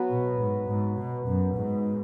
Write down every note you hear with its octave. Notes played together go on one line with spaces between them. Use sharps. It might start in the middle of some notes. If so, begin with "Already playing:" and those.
Already playing: F#3 B3 F#4 B4
B2
G#2
G#2
B2
F#2
G#2